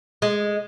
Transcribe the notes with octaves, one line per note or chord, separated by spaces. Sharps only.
G#3